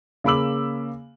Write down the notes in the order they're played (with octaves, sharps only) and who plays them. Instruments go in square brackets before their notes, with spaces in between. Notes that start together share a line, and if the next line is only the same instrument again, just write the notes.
[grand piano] C#3 A#3 B5 D6 E6 F#7